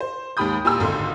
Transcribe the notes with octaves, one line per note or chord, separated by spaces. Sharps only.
C5
D#2 G#2 G4 B5 D#6 G6
A#2 G4 G#5 A#5 E6
G#1 C#2 D3 C6